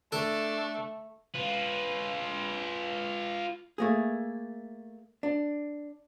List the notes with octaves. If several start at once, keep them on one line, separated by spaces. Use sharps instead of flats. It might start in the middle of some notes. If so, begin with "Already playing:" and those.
A3 D4 A4
F4 B4
A3 A#3 G#4
D4